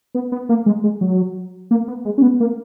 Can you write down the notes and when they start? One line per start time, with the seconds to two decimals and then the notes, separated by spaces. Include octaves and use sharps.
0.15 B3
0.32 B3
0.49 A#3
0.66 G#3
0.84 G#3
1.01 F#3
1.71 A#3
1.88 B3
2.05 G#3
2.18 C#4
2.22 B3
2.40 A#3